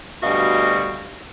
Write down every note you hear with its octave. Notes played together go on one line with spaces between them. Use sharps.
D2 B2 G3 F#4 D#5 F5